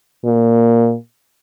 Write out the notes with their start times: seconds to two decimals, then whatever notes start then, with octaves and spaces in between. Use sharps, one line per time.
0.24 A#2